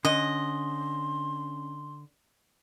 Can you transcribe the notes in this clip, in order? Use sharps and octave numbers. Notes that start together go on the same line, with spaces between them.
D3 C#4 D#5 C6